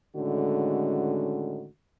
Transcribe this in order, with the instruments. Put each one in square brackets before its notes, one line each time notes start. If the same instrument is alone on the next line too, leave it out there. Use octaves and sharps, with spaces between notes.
[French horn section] A2 D3 D#3 G#3 C#4 F#4